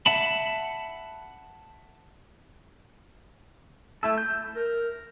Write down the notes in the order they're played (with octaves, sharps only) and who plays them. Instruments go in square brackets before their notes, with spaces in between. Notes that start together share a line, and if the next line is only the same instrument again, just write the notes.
[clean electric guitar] E5 F#5 A5 B5
[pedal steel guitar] A3 E4 A4
G6
[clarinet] A#4